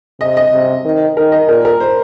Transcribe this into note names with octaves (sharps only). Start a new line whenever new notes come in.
C3 D#5
D#5
C3
D#3
D#3 A#4
D#5
A#2 A#4
A#4
C5